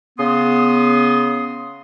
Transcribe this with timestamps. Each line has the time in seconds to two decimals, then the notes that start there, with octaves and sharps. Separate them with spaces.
0.18 C#3 B3 C6 D#6